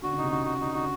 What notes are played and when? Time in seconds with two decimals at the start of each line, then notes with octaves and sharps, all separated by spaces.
0.02 D3 F#4
0.13 C#3
0.18 C3 D#4
0.32 C#3 F#4
0.46 F#4
0.61 D3 D#4
0.74 D3 F#4